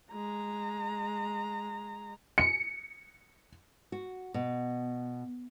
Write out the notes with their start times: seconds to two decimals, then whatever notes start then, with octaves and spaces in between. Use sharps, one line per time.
0.11 G#3 A#5
2.38 C#7
3.92 F#4
4.34 B2